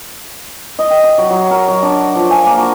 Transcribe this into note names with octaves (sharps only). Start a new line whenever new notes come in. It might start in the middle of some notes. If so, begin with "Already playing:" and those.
D#5
G5
D6
F#3
F#3
A#4
F#3
D4
F3
G#5
A#3
F#4